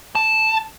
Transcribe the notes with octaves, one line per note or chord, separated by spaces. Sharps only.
A5